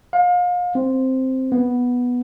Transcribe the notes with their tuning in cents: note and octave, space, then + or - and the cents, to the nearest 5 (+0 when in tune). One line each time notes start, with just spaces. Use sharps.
F5 +35
C4 +0
B3 -5